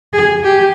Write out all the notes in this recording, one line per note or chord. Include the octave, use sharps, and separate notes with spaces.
G#4
G4